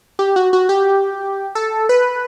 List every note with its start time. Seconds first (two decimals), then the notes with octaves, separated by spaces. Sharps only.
0.19 G4
0.36 F#4
0.53 F#4
0.69 G4
1.55 A4
1.89 B4